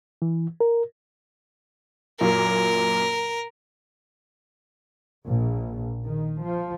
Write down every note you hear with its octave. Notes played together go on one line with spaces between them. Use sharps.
E3
A#4
F#2 A#2 A#3 A#4
A#1
D#3
F3